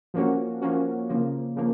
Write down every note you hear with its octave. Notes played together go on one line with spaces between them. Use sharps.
F3 A#3 C#4 F#4
F3 A#3 C#4 F#4
C#3 F3 A#3
C#3 F3 A#3